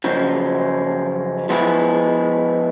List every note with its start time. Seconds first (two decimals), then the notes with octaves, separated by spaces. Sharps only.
0.04 F#2 C#3 F3 G#3
1.49 F3 G#3 B3 E4 G#4